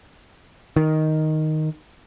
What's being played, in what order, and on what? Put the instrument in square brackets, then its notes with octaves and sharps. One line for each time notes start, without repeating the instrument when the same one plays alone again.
[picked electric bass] D#3